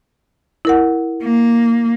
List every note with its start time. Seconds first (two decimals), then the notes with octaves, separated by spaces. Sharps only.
0.65 E4 A#4 F#5
1.22 A#3